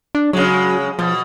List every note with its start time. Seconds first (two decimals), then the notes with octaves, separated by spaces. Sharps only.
0.15 D4
0.33 C#3 F#3 G#3
0.99 B2 F3